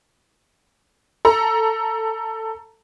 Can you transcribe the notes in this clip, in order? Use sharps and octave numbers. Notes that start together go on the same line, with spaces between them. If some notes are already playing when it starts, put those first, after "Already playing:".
A4 A#5